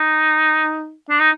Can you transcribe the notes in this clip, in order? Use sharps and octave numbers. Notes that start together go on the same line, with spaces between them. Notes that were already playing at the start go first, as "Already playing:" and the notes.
Already playing: D#4
D4
D#4